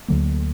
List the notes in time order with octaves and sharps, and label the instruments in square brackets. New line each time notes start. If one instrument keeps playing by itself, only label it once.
[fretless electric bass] D2 D3 F#3 A#3